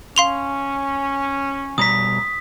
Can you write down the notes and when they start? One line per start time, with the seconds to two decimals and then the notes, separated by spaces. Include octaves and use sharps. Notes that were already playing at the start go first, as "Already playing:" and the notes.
0.16 C#4 F5 C6 F7
1.78 B2 G3 A#5 D#6 B6